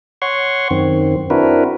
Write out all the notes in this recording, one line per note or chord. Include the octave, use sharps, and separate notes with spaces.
C#5 F#5 C6 C#6
F#2 D#3 C4
C4 D4 E4 F#4 A#4 B4